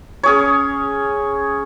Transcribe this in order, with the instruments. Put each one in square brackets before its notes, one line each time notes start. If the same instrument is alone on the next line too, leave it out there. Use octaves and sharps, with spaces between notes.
[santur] C#4 G#4 C#5